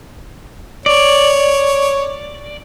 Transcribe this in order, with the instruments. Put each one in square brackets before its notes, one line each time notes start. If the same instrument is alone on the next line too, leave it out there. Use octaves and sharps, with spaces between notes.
[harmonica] C#5 [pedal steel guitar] D5